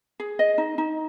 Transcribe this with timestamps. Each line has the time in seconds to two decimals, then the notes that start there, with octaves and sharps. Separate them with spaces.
0.20 G#4
0.39 D#5
0.58 D#4
0.78 D#4